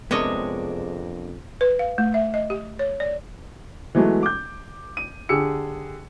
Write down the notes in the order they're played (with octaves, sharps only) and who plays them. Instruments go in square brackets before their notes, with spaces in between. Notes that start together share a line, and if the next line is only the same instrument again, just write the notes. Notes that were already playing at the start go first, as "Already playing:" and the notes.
[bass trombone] F2 [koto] C3 C#5 D#5 [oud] G#3 [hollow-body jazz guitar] B3 D4 A#4
[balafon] B4
F5
A3
E5
D#5
G4
C#5
D5
[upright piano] E3 F#3 G#3 A3 B3
D6 G6
D#7
D3 G4 G#4 E6 C#7